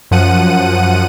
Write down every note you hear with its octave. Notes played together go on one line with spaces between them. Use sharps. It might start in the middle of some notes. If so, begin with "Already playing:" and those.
F#2 F3 F#5 D#7